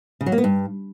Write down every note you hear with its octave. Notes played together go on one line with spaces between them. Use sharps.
C#3
F#3
A#3
B3
G2